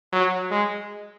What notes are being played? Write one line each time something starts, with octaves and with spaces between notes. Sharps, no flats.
F#3
G#3